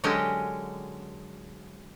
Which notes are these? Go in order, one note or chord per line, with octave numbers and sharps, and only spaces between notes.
D3 F#3 G#3 C#4 G4 A#4